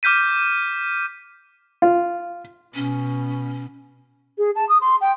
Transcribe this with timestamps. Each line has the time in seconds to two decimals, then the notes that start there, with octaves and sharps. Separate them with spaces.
0.03 D6 F6 G6 B6 D#7
1.82 F4
2.75 B2 C#4
4.38 G#4
4.55 A5
4.69 D#6
4.81 C6
5.01 G5